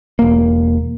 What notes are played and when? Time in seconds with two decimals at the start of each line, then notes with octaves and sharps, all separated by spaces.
0.19 E1 A#3